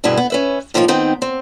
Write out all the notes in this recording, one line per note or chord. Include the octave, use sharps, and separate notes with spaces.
D2 G2 B2 E4 G#4
B3
C#4 B4 E5
A2 D#3 F3 A#3 F4
D#3 B3 C4 D#4
C4